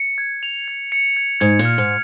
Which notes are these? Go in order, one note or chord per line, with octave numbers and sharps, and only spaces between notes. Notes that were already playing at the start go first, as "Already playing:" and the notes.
Already playing: C#7
G#6
F7
G#6
C#7
G#6
G#2 G#6
A#2
F6
G#2